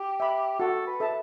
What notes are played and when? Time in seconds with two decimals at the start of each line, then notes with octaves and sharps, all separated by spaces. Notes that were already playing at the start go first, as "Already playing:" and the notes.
Already playing: G4
0.20 E5 B5
0.60 F#4 A4
0.87 B4
1.00 A4 E5 A5